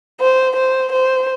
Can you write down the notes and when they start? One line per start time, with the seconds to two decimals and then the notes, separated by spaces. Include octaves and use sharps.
0.21 C5
0.56 C5
0.92 C5